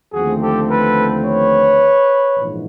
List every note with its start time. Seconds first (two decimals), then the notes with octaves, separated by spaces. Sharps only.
0.13 D#2 D3 F3 A3 C4 F#4 G#4
0.41 G4 A4
0.69 A4 B4
1.24 B4 C#5
2.36 A#1 G#2 E3